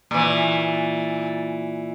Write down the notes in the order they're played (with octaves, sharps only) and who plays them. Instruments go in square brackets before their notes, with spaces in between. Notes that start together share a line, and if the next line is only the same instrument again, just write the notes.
[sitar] A#2 E3